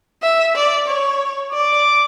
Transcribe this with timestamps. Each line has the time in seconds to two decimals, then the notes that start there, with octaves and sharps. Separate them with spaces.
0.23 E5
0.56 D5
0.88 C#5
1.52 D5 D6